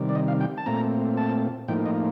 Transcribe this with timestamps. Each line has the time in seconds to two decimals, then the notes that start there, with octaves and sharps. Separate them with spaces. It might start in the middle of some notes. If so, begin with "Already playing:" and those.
Already playing: C3 D#3 G3
0.09 D5
0.15 D#5
0.28 F5
0.40 G5
0.57 A5
0.66 A#2 A3 C4 A#5
1.17 A5
1.68 A2 F3 A#3 D#4 G5
1.86 D#5